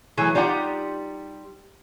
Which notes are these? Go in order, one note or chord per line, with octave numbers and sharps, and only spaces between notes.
E3 F#3 A3 G#4
G3 D#4 F4 G4 F#5